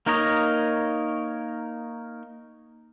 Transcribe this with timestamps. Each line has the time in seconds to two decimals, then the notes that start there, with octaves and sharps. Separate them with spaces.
0.06 A#3 D#4 A#4 C#5 D#5